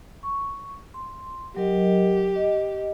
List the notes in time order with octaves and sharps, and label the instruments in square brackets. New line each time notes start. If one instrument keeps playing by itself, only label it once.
[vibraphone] C#6
C6
[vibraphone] F#3 A#4 D#5 [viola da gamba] G4
[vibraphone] D#5